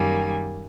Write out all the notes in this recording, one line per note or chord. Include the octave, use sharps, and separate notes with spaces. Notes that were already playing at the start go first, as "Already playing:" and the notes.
Already playing: F#2 D#3 G3 A#3 G#5